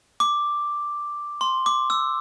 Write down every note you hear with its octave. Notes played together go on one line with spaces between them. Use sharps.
D6
C6
D6
E6